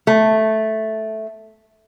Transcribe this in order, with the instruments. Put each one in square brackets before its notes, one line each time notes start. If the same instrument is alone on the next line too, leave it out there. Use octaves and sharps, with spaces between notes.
[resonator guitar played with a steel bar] A3